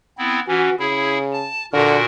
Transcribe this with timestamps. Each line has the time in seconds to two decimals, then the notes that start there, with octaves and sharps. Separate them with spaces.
0.18 B3 C4 E4
0.48 E3 C#4 F#4
0.79 C#3 E4 G#4
1.33 A5
1.73 A#2 D3 F#4 A#4